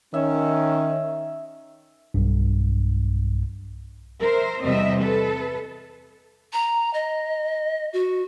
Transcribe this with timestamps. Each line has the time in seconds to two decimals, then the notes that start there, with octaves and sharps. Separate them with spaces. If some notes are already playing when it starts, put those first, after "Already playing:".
0.14 D#3 C#4 E5
2.14 B1 G2
4.20 A#4 C5 E5
4.63 E2 C3 G3 C4 D#5 E5
5.02 A4 B4
6.53 A#5
6.94 D#5
7.93 F#4